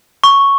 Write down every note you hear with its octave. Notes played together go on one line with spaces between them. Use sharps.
C#6